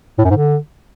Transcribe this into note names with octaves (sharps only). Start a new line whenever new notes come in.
A2
F#2
G#2
D3